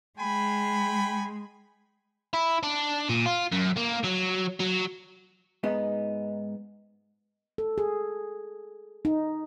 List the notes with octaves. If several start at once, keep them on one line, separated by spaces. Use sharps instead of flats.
G#3 G5 G#5 B5
E4
D4
A#2
F4
F#2
A#3
F#3
F#3
G#2 B3 D#4
A4
G#4
D#4